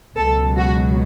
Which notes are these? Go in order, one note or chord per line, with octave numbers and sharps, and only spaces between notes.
C#2 B2 F#3 A4
F#4